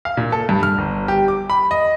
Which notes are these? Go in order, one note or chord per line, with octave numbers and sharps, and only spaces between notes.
F5
A#2
A4
G2
F6
G1
G4
D6
B5
D#5